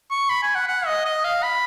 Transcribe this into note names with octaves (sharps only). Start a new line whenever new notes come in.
C#6
B5
G#5
F#5
F#5
D#5
D#5
F5
B5